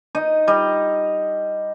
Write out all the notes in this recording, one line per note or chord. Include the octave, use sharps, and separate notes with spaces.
D#4 D#5
G3 D#5